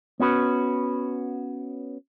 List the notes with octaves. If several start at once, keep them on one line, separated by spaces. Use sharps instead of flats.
B3 C#4 F#4 B4